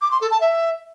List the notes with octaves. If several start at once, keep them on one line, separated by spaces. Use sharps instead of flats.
D6
C6
A4
A5
E5